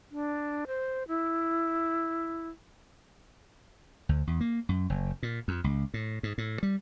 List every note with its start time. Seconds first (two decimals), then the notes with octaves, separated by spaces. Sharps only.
0.11 D4
0.67 C5
1.08 E4
4.09 D2
4.27 E2
4.41 A#3
4.69 F#2
4.90 F#1
5.23 A#2
5.48 F2
5.64 C#2
5.94 A2
6.23 G#2
6.38 A2
6.63 G3